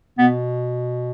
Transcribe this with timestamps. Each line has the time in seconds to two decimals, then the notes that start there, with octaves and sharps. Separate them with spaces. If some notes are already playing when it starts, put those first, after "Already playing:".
0.18 B2 B3